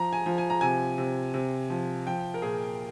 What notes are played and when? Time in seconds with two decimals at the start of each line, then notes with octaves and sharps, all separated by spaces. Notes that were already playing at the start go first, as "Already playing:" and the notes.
Already playing: F3 A#5
0.13 G#5
0.26 F3
0.38 G#5
0.50 A#5
0.61 C3 G#5
0.98 C3
1.34 C3
1.70 F3
2.07 F3 G5
2.34 A#4
2.42 A#2 G#4